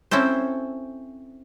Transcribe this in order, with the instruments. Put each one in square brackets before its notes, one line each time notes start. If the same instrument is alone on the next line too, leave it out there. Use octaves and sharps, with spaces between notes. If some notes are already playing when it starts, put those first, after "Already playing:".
[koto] C4 C#4 E4 A4 C5